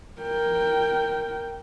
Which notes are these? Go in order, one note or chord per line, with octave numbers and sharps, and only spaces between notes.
A#4 G5